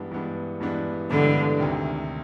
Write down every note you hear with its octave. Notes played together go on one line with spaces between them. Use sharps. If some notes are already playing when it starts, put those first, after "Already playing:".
Already playing: G2 E3 G#3 B3 D4
G2 E3 G#3 B3 D4
G2 E3 G#3 B3 D4
G2 D3 E3 G#3 B3 D4
D2 C3 D#3